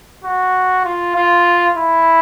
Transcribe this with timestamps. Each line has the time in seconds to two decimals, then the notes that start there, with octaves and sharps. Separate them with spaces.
0.25 F#4
0.85 F4
1.15 F4
1.77 E4